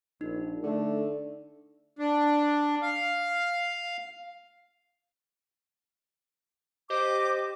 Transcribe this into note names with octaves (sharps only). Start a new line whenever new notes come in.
A#1 D#4
D3 A3
D4
F5
G4 C5 D#5 D6